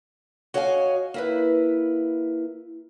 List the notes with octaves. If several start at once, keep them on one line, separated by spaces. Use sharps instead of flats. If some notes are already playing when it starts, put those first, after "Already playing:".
F#4 C#5 D#5 F5 F#5 G#5
A#3 E4 B4